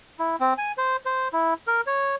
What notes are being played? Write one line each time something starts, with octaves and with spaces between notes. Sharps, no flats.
E4
C4
G#5
C5
C5
E4
A#4
C#5